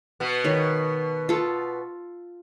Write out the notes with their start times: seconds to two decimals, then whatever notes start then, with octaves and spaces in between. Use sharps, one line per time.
0.20 B2 B3
0.44 D#3 C#5
1.29 F4 A4